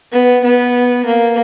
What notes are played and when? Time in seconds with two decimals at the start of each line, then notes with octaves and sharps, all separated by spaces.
0.12 B3
0.44 B3
1.05 A#3